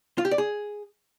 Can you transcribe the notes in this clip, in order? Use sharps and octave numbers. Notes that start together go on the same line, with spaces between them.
F4
G4
D5
G#4